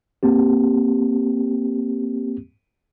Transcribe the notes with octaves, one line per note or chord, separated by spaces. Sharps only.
A#3 C4 G4